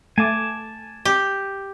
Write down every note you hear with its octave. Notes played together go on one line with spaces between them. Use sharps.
A3 G#5 A5 D6
G4